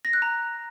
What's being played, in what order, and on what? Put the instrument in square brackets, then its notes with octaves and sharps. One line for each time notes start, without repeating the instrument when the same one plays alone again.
[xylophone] A#6
F#6
A#5